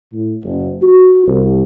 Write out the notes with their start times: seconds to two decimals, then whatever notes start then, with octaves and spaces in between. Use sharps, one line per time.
0.13 A2
0.43 F#1
0.82 F#4
1.26 C2